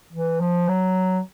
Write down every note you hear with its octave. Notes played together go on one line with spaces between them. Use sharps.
E3
F3
F#3